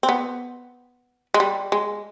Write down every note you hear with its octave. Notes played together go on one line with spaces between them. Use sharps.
C4
B3
G#3
G3
G#3